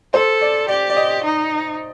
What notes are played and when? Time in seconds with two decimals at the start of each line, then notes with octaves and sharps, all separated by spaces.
0.13 A4 C5
0.41 D5
0.68 G4 D5
0.90 D5
0.97 D#5
1.24 D#4